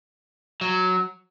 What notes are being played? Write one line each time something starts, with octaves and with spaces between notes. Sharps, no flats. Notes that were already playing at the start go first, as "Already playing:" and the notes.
F#3